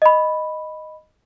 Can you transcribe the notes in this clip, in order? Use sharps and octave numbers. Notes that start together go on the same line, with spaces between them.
D#5 B5